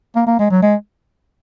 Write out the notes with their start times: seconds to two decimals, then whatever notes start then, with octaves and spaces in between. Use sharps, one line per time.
0.15 A#3
0.26 A#3
0.39 G#3
0.50 F#3
0.62 G#3